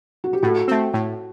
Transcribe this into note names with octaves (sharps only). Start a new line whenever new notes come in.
F#4
G4
A2 F#4 A4
A3 C4
A2